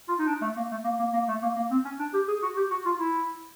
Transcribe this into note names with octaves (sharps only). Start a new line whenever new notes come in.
F4
D#4
D4
A3
A#3
A3
A#3
A#3
A#3
A3
A#3
A#3
C4
C#4
D4
G4
G#4
F#4
G4
F#4
F4
E4